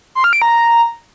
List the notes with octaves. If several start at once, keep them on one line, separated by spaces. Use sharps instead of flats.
C6
F6
D7
A#5